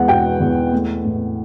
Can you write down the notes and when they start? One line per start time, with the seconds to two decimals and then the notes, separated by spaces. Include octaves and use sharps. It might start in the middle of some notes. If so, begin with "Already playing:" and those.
Already playing: E2 G#3 F#5
0.08 B2 G5
0.40 E2
0.73 A3
1.04 A2